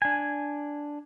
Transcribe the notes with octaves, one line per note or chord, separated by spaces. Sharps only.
D4 G#5